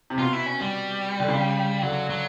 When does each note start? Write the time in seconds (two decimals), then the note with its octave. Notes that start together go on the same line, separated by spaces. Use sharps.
0.10 C3
0.19 B2 F4
0.33 E4
0.46 C#4
0.61 G3
1.20 D3
1.28 C#3
1.82 D3 F#3
2.10 F#3